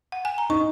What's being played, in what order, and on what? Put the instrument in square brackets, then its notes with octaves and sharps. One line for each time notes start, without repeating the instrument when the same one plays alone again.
[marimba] F#5
G#5
A#5
[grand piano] D#4 [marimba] C#6